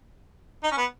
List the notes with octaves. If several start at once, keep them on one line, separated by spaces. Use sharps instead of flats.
D#4
C#4
B3